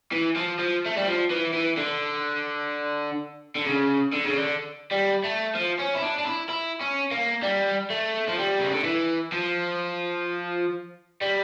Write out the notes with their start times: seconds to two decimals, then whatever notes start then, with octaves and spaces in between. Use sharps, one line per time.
0.12 E3
0.36 F3
0.59 F3
0.86 A3
0.97 G3
1.06 F3
1.31 E3
1.54 E3
1.77 D3
3.55 D3
3.66 C#3
4.13 D3
4.24 C#3
4.37 D3
4.92 G3
5.24 A3
5.55 F3
5.79 C#4
5.95 E4
6.02 D4
6.18 D4
6.25 E4
6.49 E4
6.80 C#4
7.12 A#3
7.43 G3
7.90 A3
8.28 F3
8.38 G3
8.60 C#3
8.73 D3
8.84 E3
9.32 F3
11.21 G3